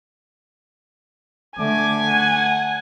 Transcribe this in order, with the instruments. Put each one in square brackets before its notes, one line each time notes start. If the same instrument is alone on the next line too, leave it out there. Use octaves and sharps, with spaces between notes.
[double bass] D3 A3 [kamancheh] G#5 [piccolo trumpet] D6
[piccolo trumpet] F#5